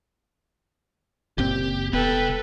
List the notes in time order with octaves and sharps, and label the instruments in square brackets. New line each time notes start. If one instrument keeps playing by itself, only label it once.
[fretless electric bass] F#1 A#2 C4 [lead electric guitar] G4
[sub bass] E1 [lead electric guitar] C2 G5 [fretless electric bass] B3 [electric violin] A4 B4